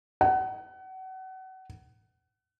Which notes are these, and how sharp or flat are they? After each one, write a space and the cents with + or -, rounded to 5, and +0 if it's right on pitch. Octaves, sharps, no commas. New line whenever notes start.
F#5 +30